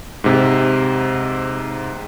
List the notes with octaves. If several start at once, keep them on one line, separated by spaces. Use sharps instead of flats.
G#2 C3